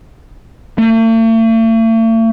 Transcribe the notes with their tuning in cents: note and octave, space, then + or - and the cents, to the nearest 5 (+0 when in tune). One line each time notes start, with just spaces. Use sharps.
A3 +45